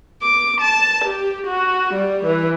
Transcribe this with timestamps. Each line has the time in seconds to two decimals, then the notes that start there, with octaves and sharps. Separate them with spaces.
0.21 D6
0.59 A5
1.02 G4
1.44 F#4
1.93 G3
2.25 E3